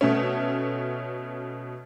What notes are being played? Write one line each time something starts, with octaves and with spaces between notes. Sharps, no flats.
B2 A3 C#4